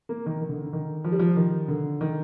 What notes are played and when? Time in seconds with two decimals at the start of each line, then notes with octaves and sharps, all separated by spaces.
0.09 A#3
0.26 D#3
0.41 D#3
0.49 D3
0.64 D3
0.73 D#3
1.04 F3
1.12 G3
1.19 F3
1.36 D#3
1.68 D3
2.01 D#3